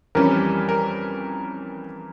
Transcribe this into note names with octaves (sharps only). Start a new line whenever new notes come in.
F2 E3 G3 C#4 A#4
A#4